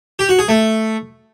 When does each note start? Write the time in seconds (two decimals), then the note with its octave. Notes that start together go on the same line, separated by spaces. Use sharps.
0.19 G4
0.29 F#4
0.39 G#4
0.49 A3